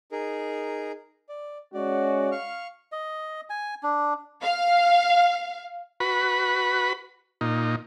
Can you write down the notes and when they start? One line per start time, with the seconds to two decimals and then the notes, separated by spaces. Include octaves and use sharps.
0.12 D#4 G#4 A#4
1.29 D5
1.74 G#3 C#4 F#4 D5
2.32 F5 C#6 F6
2.92 D#5
3.50 G#5
3.83 D4
4.43 F5
6.00 F#4 B4 B5
7.41 A#2 D#4